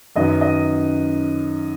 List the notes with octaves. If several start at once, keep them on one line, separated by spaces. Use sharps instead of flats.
F#2 D#3 F#3 B3 D#5
D#5